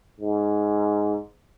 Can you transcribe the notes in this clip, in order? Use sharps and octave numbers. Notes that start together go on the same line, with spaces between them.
G#2